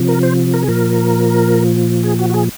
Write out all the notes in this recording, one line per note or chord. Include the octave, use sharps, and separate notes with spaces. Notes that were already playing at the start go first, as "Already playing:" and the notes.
Already playing: C3 F3
A#4
C5
A#4
G#4
A#2 F3 A#4
G#4
F#4
F#4
G#4